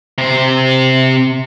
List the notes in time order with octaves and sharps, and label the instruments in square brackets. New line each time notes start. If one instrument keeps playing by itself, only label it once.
[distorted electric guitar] C3 C5